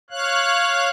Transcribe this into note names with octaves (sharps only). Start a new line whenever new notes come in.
C#5 F5 F#6